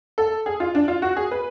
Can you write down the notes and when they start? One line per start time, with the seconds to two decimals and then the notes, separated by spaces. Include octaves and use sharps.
0.18 A4
0.46 G#4
0.60 F4
0.75 D4
0.88 F4
1.02 F#4
1.16 G#4
1.31 B4